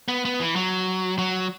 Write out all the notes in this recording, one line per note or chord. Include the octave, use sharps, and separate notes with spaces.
B3
B3
E3
F#3
F#3